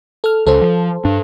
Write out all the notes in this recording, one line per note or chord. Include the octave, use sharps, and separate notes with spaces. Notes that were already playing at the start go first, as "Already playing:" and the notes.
A4 F6
C#2 A4 C5
F3
G2 D4